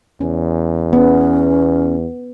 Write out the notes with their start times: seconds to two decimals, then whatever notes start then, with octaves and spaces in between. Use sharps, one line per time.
0.21 E2 C#4
0.93 B3 C#4